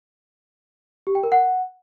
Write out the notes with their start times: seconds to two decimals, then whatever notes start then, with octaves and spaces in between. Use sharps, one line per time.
1.07 G4
1.15 G5
1.23 A#4
1.32 F#5